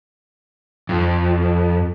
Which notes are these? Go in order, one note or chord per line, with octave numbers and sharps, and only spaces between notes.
F2